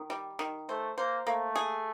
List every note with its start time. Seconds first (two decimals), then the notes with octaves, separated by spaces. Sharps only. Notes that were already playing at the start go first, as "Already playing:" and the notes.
Already playing: D#3
0.10 G3
0.39 D#3
0.69 A3 C5
0.98 A#3 C5
1.27 A3 A#3
1.56 G#4